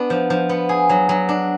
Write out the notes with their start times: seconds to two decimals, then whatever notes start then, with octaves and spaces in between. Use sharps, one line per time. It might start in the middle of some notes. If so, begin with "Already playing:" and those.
Already playing: B3 D4
0.10 F3
0.30 F3
0.49 B3
0.69 G#4
0.89 F#3
1.09 F#3
1.29 D4